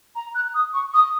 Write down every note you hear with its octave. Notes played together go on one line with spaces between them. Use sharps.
A#5
F#6
D#6
C#6
D#6